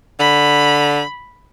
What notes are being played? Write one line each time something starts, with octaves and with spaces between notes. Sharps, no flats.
D3 B5